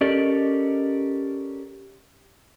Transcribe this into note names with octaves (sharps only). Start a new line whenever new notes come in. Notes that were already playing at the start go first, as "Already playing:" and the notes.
C#4 G4 A4 A#4 D5 D#5